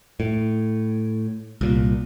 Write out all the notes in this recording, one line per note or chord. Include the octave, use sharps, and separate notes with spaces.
A2
C2 A#2